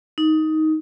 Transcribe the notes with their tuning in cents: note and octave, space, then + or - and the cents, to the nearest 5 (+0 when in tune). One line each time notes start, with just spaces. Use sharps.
D#4 +10